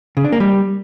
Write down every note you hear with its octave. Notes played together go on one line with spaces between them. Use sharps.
C#3
D4
A#3
G3